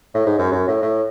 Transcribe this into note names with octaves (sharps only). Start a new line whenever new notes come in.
A2
G#2
F#2
F#2
A2
A2